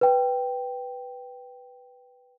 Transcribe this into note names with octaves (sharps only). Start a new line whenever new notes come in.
B4 G5